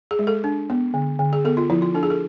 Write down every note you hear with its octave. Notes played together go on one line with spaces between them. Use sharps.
G#4
G#3
A4
D4
B3
D3
D3
G#4
B3 A4
F4
F3 E4
F4
D4 A4
G#4
A4